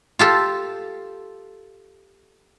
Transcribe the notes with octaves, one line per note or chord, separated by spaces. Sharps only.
F4 G4 A4